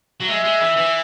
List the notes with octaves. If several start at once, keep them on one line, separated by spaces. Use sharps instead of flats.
F#3
G#3 E5
G#3
E3
E3